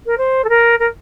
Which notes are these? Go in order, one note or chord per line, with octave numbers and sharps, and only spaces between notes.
A#4
C5
A4
A#4
A#4